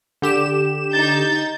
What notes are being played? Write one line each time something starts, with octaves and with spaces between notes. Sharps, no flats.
D3 G4 E7
D#4 G6 A6